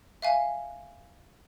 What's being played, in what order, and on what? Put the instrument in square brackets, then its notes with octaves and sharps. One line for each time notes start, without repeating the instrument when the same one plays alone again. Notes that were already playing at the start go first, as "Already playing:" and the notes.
[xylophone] E5 F5 G#5